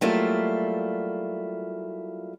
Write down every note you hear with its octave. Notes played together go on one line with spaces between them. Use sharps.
F#3 G3 A3 A#3 E4 F4